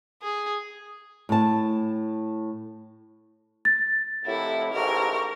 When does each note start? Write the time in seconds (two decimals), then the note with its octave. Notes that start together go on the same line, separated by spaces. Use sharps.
0.23 G#4
1.29 A2 A5
3.65 A6
4.25 F2 A2 E4 G4 A#4 F#5
4.73 A1 G#2 G4 A#4 F5 C#6